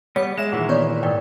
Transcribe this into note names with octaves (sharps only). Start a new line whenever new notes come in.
G3 B3 C#5
G#3 E5 E7
A#2 D#3 E3 G#4 F#5
B3 C#5 D5 C#6
G#2 A#4 D5 G5